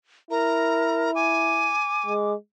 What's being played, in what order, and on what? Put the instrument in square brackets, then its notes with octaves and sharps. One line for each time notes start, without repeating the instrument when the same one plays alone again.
[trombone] E4 [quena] A#4 [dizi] A#5
[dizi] G#5 [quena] D6
[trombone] G#3